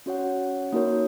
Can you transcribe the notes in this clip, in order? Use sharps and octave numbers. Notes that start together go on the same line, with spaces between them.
C#4 F#4 C#5 F#5
A#3 D#4 F#4 A#4 C#5